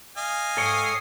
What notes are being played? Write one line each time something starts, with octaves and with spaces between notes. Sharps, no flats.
D#5 F5 G#5
G#2 A4 C#5 G5 D#6 C7